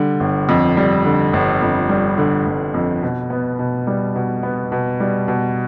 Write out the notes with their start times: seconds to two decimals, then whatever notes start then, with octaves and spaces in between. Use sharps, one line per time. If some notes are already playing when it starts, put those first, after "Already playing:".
Already playing: D3 G3
0.20 G1
0.49 F2
0.77 G3
1.05 D3
1.33 G1
1.62 F2
1.89 G3
2.18 D3
2.46 G1
2.74 F2
3.02 B2
3.30 B3
3.59 B2
3.87 G3
4.16 B2
4.43 B3
4.72 B2
5.00 G3
5.28 B2